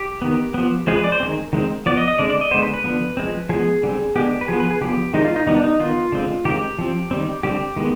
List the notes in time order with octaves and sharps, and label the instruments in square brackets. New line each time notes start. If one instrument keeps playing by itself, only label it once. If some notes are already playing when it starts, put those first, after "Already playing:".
Already playing: [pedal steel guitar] G4
D#3 B3
F3 B3
F3 G#3 C4 G#4
B4
D5
C5
D#3 G#3 C4
D#3 G#3 C4
F3 B3 D5
D#5
D#5
D3 G#3 C4 D5
D5
D#5
D3 G#3 B3 C5
B4
B4
D3 F3 B3
F3 G#3 C4
F3 G#3 B3 G#4
D3 G3 C4
D3 G#3 B3 G4
B4
F3 B3 G#4
B4
G#4
D3 F3 B3 G4
D#3 G#3 C4 D#4
F4
D#4
D#3 G3 B3 D#4
D4
D#4
D#3 B3 F4
D3 G#3 C4
D#3 G#3 C4 G4
F3 C4
D#3 G3 C4
D3 G3 C4 G4
D#3 G#3 B3